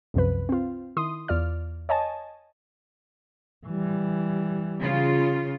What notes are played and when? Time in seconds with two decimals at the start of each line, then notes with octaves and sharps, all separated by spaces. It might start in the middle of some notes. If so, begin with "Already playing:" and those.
0.14 C2 F#2 C3 F3 B4
0.49 C4 F4
0.97 D#3 E4 C6 D#6
1.28 E2 F4 D5 F6
1.89 C#5 D#5 G#5 A5
3.66 E3 G3
4.81 C#3 F4